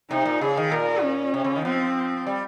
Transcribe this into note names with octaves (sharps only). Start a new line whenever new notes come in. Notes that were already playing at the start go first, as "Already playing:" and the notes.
C3 D#4
A#2
C#3 G#4
D#3
A#2 A#4
C#4
C3
C#3
D#3
F3 C4
G3